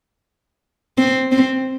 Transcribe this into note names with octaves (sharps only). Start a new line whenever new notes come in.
C4
C4